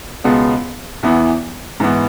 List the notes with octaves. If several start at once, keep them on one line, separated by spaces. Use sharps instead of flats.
C#2 B2 G#3 B3
E2 E3 B3 E4
G#2 E3 B3